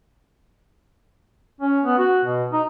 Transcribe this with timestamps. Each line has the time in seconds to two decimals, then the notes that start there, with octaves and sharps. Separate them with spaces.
1.61 C#4
1.85 B3
1.98 F#4
2.25 B2
2.52 D#4